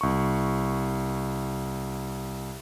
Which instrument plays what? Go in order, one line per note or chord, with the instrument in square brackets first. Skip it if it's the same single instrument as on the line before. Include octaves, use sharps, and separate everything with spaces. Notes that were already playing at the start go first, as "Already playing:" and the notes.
[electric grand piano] C2 C#6